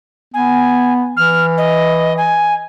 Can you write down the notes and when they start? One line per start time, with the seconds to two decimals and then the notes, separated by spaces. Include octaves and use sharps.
0.34 B3 G#5
1.17 E3 F6
1.58 D#5
2.17 G#5